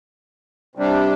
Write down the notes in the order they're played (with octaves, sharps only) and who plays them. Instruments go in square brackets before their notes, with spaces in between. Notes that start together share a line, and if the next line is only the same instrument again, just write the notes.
[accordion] C3 G3 D4